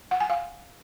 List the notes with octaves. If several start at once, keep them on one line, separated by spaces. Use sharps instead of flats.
F#5
G#5
F5